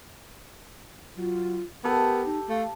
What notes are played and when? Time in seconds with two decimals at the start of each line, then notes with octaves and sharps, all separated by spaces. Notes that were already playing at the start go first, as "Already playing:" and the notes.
1.17 F#3 F4
1.84 B3 G4 A4 A#4
2.26 D#4
2.49 A3 F5